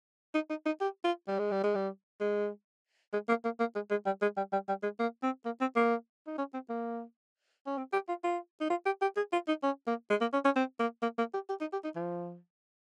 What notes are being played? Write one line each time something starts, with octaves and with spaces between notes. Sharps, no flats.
D#4
D#4
D#4
G4
F4
G3
G#3
G3
G#3
G3
G#3
G#3
A#3
A#3
A#3
G#3
G#3
G3
G#3
G3
G3
G3
G#3
A#3
C4
A#3
C4
A#3
D#4
C#4
C4
A#3
C#4
C4
G4
F4
F4
D#4
F4
G4
G4
G#4
F4
D#4
C#4
A#3
G#3
A#3
C#4
C#4
C4
A#3
A#3
A#3
G4
G4
D#4
G4
D#4
F3